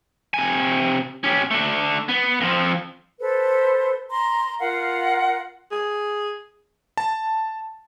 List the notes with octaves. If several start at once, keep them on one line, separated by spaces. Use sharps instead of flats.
C3 G#5
C#4 G4
A3 D4
B3
F2 F3
A4 B4 C5
A#5 C6
F4 A#4 F5 F#5
G#4
A5